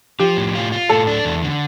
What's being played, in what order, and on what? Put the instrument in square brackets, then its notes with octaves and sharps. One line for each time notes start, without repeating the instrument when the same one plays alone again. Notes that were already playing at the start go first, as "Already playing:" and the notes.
[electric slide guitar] F3 [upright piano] G4
[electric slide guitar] A2
F4
F4
[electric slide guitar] A2 [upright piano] A4
[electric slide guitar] D4
E2
D3